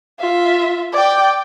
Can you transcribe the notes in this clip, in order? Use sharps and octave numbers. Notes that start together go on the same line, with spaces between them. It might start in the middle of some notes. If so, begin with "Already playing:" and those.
F4 E5
D5 G5